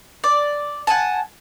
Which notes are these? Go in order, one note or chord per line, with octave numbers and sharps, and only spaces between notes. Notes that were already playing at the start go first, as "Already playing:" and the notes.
D5
F#5 G#5 A5